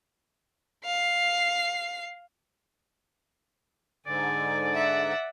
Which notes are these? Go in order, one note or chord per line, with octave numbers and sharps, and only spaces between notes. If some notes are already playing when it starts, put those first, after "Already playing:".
F5 C7
G#2 D3 D5 G#5
E5 F#5